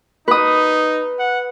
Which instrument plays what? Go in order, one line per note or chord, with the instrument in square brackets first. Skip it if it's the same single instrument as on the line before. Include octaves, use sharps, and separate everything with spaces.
[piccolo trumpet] D#4 [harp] B4 D#6
[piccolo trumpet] F#5